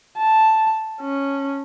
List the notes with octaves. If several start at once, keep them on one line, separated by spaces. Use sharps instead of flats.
A5
C#4